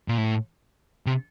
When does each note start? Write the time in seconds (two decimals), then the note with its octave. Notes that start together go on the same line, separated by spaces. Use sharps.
0.08 A#2
0.18 A2
1.06 C3